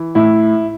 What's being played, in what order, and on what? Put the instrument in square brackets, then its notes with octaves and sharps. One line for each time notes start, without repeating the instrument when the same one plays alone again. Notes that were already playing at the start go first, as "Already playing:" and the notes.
Already playing: [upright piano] E3
A2 E4